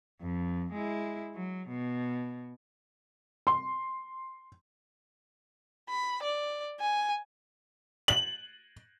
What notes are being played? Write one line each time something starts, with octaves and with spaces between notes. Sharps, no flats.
F2
G#3 E4
F#3
B2
C6
B5
D5
G#5
F#7